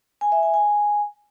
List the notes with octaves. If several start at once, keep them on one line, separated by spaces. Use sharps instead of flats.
G#5
E5
G#5
G#5